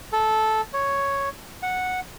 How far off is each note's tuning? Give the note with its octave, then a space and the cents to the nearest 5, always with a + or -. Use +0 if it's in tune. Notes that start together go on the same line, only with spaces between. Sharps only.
A4 -10
C#5 +0
F#5 -5